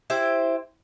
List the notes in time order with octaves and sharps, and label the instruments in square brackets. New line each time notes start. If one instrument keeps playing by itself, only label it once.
[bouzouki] E4 G4 C5